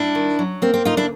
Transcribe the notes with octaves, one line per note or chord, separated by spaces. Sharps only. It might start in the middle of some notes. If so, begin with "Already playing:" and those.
Already playing: G3 D4 E4
D#3
F#3
A#3 C4
C4
D2 D#4 F4
D4 E4